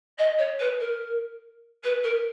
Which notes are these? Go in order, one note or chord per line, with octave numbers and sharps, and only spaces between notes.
D#5
C#5
B4
A#4
B4
A#4